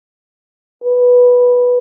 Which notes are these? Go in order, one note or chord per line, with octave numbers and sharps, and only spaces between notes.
B4